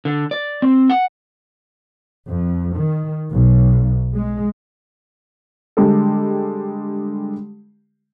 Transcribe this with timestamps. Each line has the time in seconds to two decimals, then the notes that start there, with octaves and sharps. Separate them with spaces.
0.05 D3
0.31 D5
0.62 C4
0.90 F#5
2.27 F2
2.76 D#3
3.32 B1
4.14 G#3
5.77 D3 G3 G#3 G4 A4